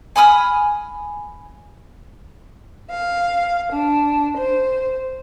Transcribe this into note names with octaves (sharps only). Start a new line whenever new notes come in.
G#5 B5 D#6 F6
F5
D4
C5